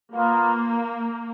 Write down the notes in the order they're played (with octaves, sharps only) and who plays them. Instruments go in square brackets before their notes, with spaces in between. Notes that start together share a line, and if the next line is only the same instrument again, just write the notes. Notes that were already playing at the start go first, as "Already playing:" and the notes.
[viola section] A#3 [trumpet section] B3 F4 A#4 F5